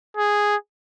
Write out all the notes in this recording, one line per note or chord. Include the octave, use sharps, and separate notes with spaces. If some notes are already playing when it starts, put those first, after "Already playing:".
G#4